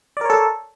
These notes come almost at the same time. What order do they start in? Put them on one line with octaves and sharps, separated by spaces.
D5 A#4 C#5 A4